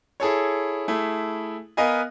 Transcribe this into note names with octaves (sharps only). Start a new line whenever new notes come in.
E4 G#4 A4 C#5
A3 E4 G#4
B3 A#4 B4 D#5 F5 G#5